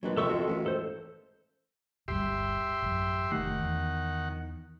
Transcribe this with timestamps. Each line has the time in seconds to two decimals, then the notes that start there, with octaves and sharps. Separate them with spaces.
0.03 A#1 D#3 F#3 G#3 B4
0.17 F2 C3 B3 A4 E5 C#6 E6
0.30 F4 F#4 A4
0.47 A1
0.66 A4 C5
2.08 D1 G1 G3 G4 E5 C6
2.82 A1 F#2
3.31 F1 D#3 A3 F#5
3.62 E2